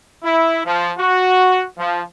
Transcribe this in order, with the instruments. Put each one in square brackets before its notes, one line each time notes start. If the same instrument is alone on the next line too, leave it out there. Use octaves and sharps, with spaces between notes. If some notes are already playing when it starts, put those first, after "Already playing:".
[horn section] E4
F3
F#4
F3